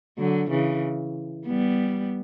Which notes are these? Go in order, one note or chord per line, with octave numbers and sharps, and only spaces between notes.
D3 F#3
C#3 E3
G3 B3